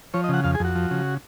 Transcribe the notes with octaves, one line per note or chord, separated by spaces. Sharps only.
F3 C#5
D#5
C#3 F#5
F2 F5
G#4
F2 F#4
F3
C#3